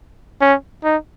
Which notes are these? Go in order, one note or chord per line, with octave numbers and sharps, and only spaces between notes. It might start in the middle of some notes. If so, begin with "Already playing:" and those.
C#4
D#4